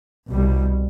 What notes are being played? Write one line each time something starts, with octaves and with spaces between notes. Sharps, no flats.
C2 B2 G3